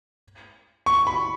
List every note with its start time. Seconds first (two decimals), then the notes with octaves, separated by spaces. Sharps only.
0.86 C#6
1.07 B5